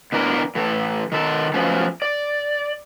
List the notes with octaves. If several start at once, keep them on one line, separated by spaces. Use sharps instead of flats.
B2 E3 D4 A#4
A2 E3 A4
D#3 A4
F3 F#3 A3 B3 C#4
D5